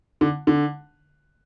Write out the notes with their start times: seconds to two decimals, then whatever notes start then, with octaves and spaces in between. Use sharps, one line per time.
0.21 D3
0.47 D3